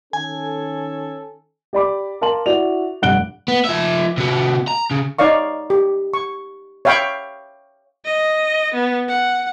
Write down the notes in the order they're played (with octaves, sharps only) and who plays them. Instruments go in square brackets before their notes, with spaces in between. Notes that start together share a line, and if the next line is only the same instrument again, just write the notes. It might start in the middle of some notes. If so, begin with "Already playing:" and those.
[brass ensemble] D#3 C#4 A4 [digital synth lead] G#5
[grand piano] G4 D5 B5 D6
A#4 F5 A5 C6 F#7
E4 F#4 D5 F7
F1 G2 F#5 F#6 D7 G7
[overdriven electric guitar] B3
F3 E5
C3 F#4
A#5
C#3
[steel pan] D#4 C#5 D5 F5 C#6
G4
C#6
C#5 E5 F5 G5 B5 C#6
[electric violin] D#5
B3
F#5